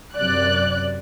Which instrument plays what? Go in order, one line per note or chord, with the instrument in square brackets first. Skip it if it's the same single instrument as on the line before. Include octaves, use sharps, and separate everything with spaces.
[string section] F#2 C3 D5 F#6